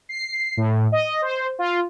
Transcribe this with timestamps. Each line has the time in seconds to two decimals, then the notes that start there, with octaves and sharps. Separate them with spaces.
0.09 C7
0.57 A2
0.92 D#5
1.22 C5
1.59 F4